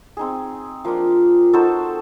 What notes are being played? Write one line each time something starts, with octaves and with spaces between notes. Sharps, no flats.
C4 D#4 G#4
F3 A#3 D4 F4
D#4 F#4 A4 C5